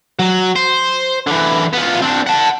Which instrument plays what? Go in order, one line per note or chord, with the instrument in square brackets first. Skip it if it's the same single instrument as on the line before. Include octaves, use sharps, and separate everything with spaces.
[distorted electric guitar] F#3
C5
D3 E3
B3 F4
C4 D4
F#5 A5